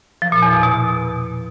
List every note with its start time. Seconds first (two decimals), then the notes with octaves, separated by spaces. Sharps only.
0.22 F3
0.32 A#2
0.42 E2
0.53 B2
0.63 B2